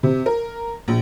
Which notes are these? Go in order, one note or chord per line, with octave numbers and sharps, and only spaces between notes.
C3
A#4
A#1